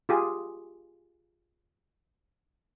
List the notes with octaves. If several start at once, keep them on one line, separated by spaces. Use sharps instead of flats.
F4 G4 G#4